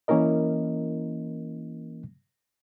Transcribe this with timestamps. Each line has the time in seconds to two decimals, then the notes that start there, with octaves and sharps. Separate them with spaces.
0.08 E3 A#3 C#4 E4 A#4 D#5